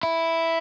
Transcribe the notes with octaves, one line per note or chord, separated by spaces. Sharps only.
E4